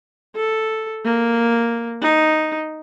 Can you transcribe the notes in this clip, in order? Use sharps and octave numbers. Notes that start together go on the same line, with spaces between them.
A4
A#3
D#4